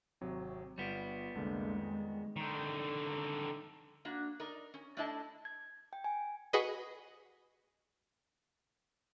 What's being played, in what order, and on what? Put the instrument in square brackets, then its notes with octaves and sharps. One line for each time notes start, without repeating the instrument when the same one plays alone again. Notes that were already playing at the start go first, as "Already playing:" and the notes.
[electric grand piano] G#1 C3 F#3
[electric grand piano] G1 F4 D7 [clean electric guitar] G3 B3
[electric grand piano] C2 D3 A#3 [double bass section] F2 G#3
[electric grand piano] D#3
[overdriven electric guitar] D3 D#3
[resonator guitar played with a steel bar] A#3 D4 F#4
D#4 A#4 D5
C#4
A3 D4 E4 D5 D#5 A5
[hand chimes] G#6
G5
G#5
[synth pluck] F#4 G#4 B4 D#5